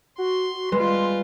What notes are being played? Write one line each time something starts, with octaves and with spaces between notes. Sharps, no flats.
F#4 C6
G3 G#3 F4 B4 C6